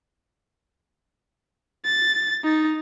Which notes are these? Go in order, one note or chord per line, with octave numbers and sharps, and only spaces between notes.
A6
D#4